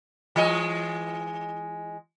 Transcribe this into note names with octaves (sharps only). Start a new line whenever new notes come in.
E3 G#3 D#5